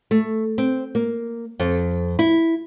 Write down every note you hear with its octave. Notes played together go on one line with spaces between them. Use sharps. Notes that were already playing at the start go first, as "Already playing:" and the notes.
A3
C4
A#3
F2
E4